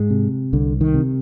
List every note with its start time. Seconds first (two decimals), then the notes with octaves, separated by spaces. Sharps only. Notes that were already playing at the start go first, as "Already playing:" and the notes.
Already playing: G#2 G#3
0.10 C3
0.53 C2 D3
0.81 D#3
0.94 C3